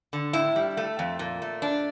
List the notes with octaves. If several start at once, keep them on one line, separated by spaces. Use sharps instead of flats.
D3
A2 E4
G3
A3
F2
A#2
A3
D4